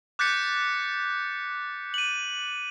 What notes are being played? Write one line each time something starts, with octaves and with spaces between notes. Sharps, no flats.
D6 F#6 G6 A6 B6 C#7
D#7 F#7